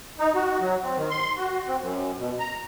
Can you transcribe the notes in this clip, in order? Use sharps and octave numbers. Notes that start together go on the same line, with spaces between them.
D#4
F#4
F#3
C4
D#3
C6
F#4
C4
F#2
B2
A#5